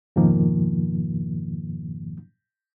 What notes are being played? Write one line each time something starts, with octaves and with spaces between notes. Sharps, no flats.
F2 G#2 B2 D#3 F3 A#3